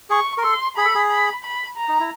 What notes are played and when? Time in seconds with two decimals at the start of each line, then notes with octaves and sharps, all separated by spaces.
0.10 G#4 C#6
0.38 A#4
0.44 A4 C6
0.77 G#4 B5
0.85 A4
0.95 G#4
1.10 B5
1.44 B5
1.77 A#5
1.89 D#4
2.00 E4